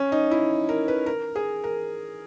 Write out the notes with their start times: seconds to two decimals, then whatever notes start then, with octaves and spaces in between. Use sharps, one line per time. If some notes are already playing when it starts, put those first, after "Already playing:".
Already playing: C#4
0.12 D#4
0.31 E4
0.69 A#4
0.88 B4
1.06 A#4
1.36 G#4
1.64 A#4